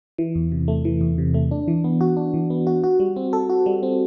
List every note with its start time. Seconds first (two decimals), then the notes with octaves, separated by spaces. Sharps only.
0.18 E3
0.35 E2
0.52 C3
0.68 A3
0.85 E3
1.01 E2
1.18 C3
1.34 A3
1.51 D4
1.68 E3
1.84 B3
2.01 F#4
2.17 D4
2.34 E3
2.50 B3
2.67 F#4
2.84 F#4
3.00 G3
3.16 C4
3.33 A4
3.50 F#4
3.66 G3
3.83 C4